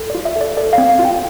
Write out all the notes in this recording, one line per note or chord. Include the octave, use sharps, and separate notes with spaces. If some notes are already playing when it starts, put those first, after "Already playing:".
Already playing: A4
F4 D5
E5
A4 D5
A4 D5
F5
C4
F5
F4
G5